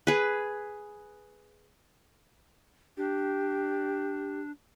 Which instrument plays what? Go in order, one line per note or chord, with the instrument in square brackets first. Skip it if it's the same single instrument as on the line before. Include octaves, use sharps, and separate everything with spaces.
[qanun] G#4 B4
[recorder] D4 [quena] G4